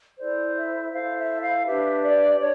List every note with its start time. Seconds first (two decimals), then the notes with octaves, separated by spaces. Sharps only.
0.18 E4 A4 C5 D5
0.55 E5
0.92 E4 A4 C5 F5
1.17 E5
1.41 F5
1.65 D4 G4 B4 E5
2.02 D5
2.39 D4 C#5